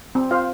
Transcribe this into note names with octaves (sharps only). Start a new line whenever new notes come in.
C4
F4 C5 F5